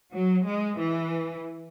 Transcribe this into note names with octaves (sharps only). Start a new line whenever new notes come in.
F#3
G#3
E3